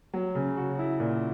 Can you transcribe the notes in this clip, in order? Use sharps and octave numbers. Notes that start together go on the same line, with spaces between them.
F#3
C#3
F#4
E4
A#2